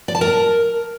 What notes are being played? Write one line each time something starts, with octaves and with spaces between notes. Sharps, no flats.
D5
A5
A#4